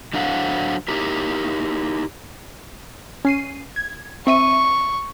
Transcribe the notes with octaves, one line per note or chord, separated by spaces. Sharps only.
F#3 D4 A4 C5 F5 F#5
D#4 E4 G4 A#4
C#4 C7 D#7
G#6
C4 E5 C#6 D#7